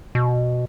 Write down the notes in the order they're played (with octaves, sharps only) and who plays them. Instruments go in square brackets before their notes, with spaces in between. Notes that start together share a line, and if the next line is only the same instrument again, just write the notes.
[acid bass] B2